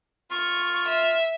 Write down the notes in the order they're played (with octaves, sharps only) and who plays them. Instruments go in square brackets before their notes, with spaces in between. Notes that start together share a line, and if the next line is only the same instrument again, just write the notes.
[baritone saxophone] F4 [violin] C#6
[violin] E5